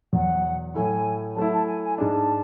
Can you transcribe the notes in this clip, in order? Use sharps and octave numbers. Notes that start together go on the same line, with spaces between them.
E2 B2 F#3 F#5
A2 F#3 A3 E4 G#5
F#3 A3 E4 A5
A5
G#5
G#5
G#2 G#3 D4 A5